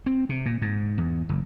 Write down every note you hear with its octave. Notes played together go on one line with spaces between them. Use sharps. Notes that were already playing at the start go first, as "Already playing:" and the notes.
C4
C3
A#2
G#2
E2
F#1